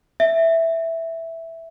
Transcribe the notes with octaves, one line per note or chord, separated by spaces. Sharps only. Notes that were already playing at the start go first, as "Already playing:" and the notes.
E5